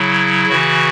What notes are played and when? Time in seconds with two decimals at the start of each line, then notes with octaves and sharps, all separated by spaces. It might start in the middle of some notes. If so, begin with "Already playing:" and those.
Already playing: C#3 F#3 E4
0.49 C#3 E3 F#4